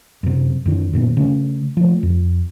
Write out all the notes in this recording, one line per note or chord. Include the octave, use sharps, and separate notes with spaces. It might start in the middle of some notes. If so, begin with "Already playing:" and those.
F#2 C3
F#2 D#3
F#2 A#2 D#3 B3
C#3 A3
F3 A3
F2